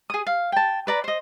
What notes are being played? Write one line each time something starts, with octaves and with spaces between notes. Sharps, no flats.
G#4 D#6
F5
G5 A5
B4 D5 A#5
C5 D#5